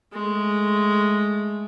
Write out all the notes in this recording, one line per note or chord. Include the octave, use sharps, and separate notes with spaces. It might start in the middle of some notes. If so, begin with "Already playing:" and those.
G#3 A3